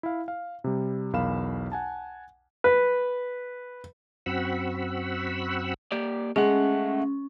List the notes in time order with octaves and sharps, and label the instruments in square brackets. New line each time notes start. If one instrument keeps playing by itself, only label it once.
[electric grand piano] E4 F5
F5
C3 G3
B1 E2 A#4 F5 B5 E7
F#5 G#5 A5
[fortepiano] B4
[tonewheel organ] F#2 C4 F#4 F#5 B5 E6
[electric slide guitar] A#3 G4 D5
[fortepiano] G#3 [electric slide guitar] A3 F#5 [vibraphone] C#4